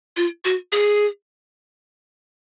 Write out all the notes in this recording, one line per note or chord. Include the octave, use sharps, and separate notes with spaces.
F4
F#4
G#4